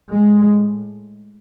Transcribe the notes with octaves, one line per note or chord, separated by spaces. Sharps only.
A2 G#3